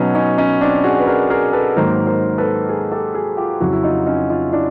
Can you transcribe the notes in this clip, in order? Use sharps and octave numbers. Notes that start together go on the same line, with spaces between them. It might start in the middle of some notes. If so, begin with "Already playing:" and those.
Already playing: B2 F#3 B3 C#4 D#4
C#4 D#4
C#4 D#4
C4 D4
F#4 G#4
B4
G#4 A#4
G#4 A#4
A4 B4
G#2 D#3 F#3 A#3 A#4 C5
A#4 C5
A4 B4
G#4 A#4
G4 A4
F#4 G#4
F4 G4
F2 C#3 F#3 E4 F#4
E4
D#4 F4
C#4 D#4
D#4 F4
D4 E4